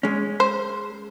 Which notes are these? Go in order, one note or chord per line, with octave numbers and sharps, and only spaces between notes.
G#3 C#4
C5